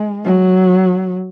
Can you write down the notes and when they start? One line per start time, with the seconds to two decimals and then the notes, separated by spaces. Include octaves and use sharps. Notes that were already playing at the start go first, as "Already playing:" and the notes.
Already playing: G#3
0.24 F#3